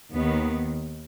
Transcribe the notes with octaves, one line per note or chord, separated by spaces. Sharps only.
D#2 D#3 B3